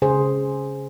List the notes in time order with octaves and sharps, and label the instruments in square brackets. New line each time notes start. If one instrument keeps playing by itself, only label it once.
[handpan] C#3 G#4 C5